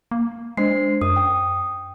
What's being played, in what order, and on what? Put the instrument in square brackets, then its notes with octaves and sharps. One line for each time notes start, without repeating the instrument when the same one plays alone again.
[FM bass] A#3
[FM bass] G#3 [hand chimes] D4 C5 C7
[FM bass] F#2 [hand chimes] D#6
[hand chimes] G5 D#6